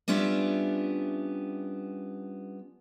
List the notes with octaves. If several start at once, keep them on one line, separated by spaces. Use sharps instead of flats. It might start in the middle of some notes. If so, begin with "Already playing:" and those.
G3 B3 C#4 D4 F4 E5